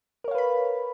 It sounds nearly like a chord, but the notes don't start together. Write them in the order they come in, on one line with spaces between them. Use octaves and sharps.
A#4 C#5 F5 B4 B5